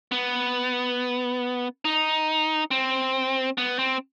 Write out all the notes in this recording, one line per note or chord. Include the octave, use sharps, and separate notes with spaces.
B3
D#4
C4
B3
C4